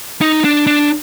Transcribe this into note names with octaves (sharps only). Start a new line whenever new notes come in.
D#4
D4
D4